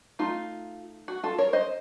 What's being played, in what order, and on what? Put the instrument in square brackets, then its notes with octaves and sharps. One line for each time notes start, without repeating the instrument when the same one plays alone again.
[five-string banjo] A3 D#4 F4
F#4
F4 A4
A#4 C#5
C5 D#5